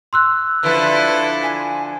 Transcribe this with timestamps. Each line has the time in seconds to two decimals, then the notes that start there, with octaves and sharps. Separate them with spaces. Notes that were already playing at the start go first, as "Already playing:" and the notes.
0.13 C6 E6 F#6
0.63 D3 F3 E4 A4 B4
1.43 G#5